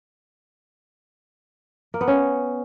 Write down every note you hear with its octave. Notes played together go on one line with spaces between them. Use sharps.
A#3
B3
C#4